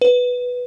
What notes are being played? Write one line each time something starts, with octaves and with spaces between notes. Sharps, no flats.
B4